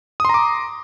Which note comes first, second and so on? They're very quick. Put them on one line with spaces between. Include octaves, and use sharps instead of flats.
D#6 C6 A#5 D6